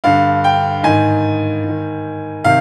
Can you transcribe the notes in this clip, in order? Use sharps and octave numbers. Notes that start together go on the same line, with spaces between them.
G2 D3 F5
G5
G#2 D#3 G#5
G#2
D#3
C3 D#3 F5